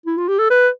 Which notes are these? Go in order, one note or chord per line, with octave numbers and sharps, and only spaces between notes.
E4
F4
G4
A4
B4